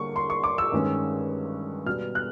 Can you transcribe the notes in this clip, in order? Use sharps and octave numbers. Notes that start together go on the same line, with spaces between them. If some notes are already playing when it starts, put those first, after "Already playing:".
Already playing: D3 G3 A#3 C#6
C6
C#6
D6
E6
G2 D#3 G#3 C#4
B2 G3 B3 F6
F#6